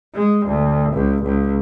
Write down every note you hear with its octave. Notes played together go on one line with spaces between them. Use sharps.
G#3
D2
C#2
C#2